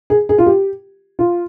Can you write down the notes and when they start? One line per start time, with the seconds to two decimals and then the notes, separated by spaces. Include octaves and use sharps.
0.10 G#4
0.29 G#4
0.38 F4
0.46 G4
1.19 F4